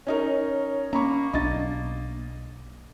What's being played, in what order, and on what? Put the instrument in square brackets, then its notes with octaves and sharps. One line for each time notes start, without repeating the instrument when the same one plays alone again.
[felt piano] C#4 D#4 A#4 [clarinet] C#5
[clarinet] A#3 [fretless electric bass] C#4 [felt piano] A#5 B5 C#6
[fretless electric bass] B1 D4 [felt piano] D#5 A6